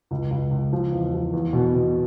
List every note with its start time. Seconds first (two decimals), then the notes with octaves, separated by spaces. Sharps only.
0.11 C#2
0.31 C#2
0.51 C#2
0.73 F3
0.92 E2
1.13 F3
1.33 E2
1.53 B2
1.74 B2